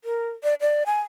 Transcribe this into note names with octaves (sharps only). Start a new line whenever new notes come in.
A#4
D5
D5
G#5